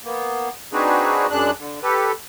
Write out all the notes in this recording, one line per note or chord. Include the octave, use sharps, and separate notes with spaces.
A#3 B3
C4 D4 D#4 F#4 G#4 B4
F#2 G#3 D4 F#6
D3
G4 A4 B4